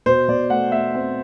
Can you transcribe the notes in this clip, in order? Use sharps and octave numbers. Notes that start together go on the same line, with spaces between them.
B2 C5
B2 D5
A3 F#5
A3 E5
C4